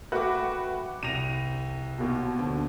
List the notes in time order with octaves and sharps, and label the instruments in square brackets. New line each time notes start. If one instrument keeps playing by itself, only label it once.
[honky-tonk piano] A3 F#4 B4 [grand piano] F#5 G5 D6
[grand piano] C2 A#6 [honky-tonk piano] D#7 F7
[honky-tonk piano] D#2 B2
[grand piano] D2 D3